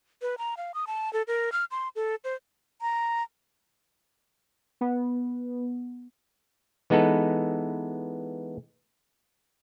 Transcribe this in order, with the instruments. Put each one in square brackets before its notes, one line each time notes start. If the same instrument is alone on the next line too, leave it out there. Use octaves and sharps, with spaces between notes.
[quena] B4
A#5
F5
D#6
A5
A4
A#4
F6
C6
A4
C5
[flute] A#5
[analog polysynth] B3
[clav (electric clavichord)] E3 G#3 B3 D#4 A4 B4